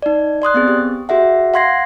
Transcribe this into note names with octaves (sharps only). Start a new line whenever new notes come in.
D#4 D5
D5 C6 D#6 F#6
B3 C4 G#4
G4
F#4 G#4 E5 F#5
F5 F#5 C6 G#6 A#6 C7